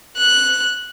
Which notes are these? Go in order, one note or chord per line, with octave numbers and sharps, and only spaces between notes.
F#6